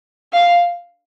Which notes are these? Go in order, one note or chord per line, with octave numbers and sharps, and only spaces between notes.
F5